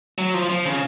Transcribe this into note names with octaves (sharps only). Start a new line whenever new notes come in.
F#3
F3
F3
C#3